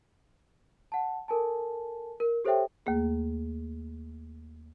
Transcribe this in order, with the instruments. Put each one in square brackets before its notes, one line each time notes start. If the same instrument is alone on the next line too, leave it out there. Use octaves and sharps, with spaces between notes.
[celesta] F#5 A5
A4 A#4 G#5 A5
A#4
G4 A4 C5 C#5 E5 G5
[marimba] D#2 A3 A#3 G#4